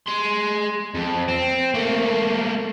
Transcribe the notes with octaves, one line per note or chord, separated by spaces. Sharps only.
G#4 C6
F2
C4
A3 A#3